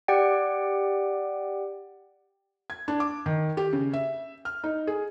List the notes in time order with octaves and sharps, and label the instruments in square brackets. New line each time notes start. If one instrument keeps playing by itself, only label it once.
[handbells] G4 D5 F#5 G5
[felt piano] G#6
D4
D6
D#3
G4
C#3
E5
F6
D#4
G#4